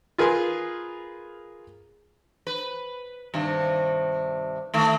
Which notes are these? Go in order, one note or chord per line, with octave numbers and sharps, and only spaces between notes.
F4 G#4 A#4 B4 G#5 C6
B4
G2 C3 D#3
D#3 A3